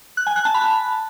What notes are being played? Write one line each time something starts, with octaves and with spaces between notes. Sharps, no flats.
F#6
G#5
F#6
A5
B5